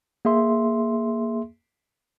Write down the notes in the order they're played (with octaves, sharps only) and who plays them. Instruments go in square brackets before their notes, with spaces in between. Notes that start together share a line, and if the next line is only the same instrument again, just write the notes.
[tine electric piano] A#3 G#4 E5 C6